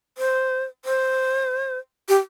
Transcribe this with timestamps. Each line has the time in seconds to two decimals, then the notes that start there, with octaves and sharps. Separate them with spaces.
0.18 C5
0.85 C5
2.09 G4